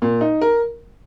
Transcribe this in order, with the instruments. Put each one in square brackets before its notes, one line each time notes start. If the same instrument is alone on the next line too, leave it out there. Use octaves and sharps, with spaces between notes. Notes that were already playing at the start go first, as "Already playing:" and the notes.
[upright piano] A#2
D#4
A#4